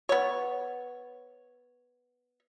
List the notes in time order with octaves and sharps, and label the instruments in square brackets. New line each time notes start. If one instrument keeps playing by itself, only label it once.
[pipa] B3 C#5